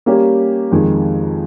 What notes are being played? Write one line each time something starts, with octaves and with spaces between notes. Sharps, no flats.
G3 A#3 C#4 G4
F2 D#3 G#3